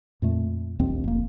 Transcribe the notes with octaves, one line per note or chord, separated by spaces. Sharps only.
F2 A#2 A3
D1 A#1 D#2 C4
F1 A#3